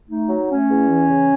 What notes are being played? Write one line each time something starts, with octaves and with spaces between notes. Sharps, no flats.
A3 D#4
F#3
A3 C#4
E2
E3
C#3